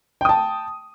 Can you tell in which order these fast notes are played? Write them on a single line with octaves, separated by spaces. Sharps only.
G5 D#6 A5